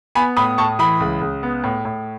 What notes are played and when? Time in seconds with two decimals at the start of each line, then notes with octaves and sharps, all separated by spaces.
0.15 B3 G#5 B5
0.37 A2 B5 D#6
0.58 A2 A5 C#6
0.79 E3 B5 D#6
1.00 C#2
1.21 C#2
1.43 B3
1.64 A2
1.85 A2